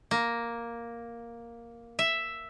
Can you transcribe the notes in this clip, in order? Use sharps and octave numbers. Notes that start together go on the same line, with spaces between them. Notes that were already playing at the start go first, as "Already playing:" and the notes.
A#3
E5